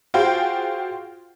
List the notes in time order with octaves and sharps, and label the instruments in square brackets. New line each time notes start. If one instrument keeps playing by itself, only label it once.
[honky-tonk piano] F4 F#4 G#4 C5 G5